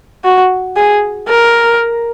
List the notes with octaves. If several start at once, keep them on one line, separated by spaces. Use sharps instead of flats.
F#4
G#4
A#4